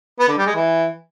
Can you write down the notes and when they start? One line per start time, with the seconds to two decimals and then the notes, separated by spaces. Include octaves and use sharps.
0.19 B3
0.28 D3
0.37 G3
0.46 G#3
0.55 E3